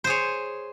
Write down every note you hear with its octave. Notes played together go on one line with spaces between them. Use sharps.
G#4 C5 C#5